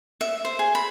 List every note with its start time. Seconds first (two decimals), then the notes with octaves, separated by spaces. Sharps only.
0.21 E5
0.45 C5
0.59 G#4
0.75 B5